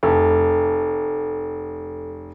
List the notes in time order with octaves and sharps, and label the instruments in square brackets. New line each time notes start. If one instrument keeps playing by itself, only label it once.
[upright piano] F1 [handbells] A4